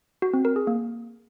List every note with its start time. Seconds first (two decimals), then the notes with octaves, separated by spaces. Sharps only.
0.22 F#4
0.33 C4
0.45 A#4
0.56 G#4
0.67 A#3